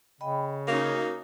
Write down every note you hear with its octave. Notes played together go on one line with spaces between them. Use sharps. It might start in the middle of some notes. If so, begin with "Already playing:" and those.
C#3 D#5 G5 B5
A#3 C#4 D#4 F#4